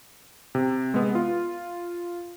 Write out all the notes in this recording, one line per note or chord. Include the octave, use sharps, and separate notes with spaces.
C3
G#3 B3
F4